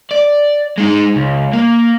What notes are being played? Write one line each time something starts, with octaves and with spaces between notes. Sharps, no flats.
D5
G#3 D#4
C#2
A#3